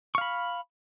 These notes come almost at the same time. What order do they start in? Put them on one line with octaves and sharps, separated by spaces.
C#6 F5 B5